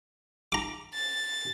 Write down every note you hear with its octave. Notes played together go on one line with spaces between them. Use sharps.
A#5 D6
A6